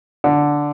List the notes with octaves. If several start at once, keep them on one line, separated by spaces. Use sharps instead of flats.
D3